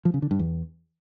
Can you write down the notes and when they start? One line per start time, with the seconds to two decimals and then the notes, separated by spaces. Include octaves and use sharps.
0.05 F3
0.14 C#3
0.22 D3
0.31 G2
0.39 E2